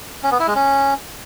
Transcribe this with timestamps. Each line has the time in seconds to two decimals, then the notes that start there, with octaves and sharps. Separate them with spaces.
0.23 C#4
0.31 B3
0.39 E4
0.47 G#3
0.55 C#4